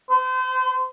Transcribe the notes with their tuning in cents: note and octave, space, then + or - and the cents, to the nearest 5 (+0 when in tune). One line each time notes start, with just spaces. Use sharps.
C5 -35